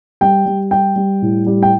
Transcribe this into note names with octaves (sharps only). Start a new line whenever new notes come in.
G3 G5
G3
G3 G5
G3
A2
G3
G5